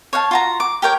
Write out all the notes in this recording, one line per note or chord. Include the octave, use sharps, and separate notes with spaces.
C#5 F5 F#5 A5
F4 F#4 A#5
D6
G4 A#4 C#5 G5